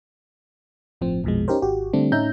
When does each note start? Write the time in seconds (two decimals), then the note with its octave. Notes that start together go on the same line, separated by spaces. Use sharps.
1.01 G1 A2 F3 C4
1.24 A#1 F2 B2 F3 G#3
1.48 C#4 D#4 G4 A#4 C5
1.62 G#1 F#4 G4
1.93 D3 G3 A3 C4 D4
2.12 A2 C#4 D#4 E5 A#5 G6